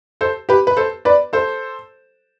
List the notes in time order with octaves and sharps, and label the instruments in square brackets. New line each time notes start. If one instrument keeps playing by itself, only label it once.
[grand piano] A4 C5
G4 B4
B4
A4 C5
B4 D5
A4 C5